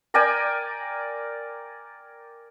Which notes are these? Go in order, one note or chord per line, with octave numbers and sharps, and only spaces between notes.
A#4 D5 G5 G#5